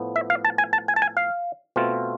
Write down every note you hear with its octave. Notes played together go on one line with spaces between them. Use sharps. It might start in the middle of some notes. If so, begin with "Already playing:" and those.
Already playing: A2 F3 B3
E5
F5
A5
G#5
A5
G#5
A5
G#5
F5
B2 A3 C4 F4